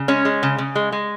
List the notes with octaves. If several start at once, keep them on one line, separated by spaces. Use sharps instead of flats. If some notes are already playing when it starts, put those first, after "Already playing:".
Already playing: C#3
G#3 C#4
G#3
C#3
C#3
G#3
G#3